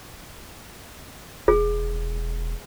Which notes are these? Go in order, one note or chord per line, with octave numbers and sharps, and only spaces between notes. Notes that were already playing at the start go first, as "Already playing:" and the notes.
E1 G#4